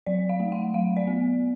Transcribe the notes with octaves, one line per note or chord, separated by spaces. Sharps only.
F#3 D5
F5
A3
F#5
F#3 F5
D5
B3